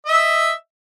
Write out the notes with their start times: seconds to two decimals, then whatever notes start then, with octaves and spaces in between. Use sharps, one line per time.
0.05 D#5
0.09 E5
0.12 E6